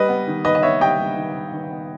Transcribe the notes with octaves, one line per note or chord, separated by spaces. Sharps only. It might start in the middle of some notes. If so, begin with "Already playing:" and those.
Already playing: G3 B4 D#5
B3
D#3
D#3 B4 D#5
D#5
B3 C#5 E5
G3 D#5 G5
G3
D#3
D#3
D#3
B3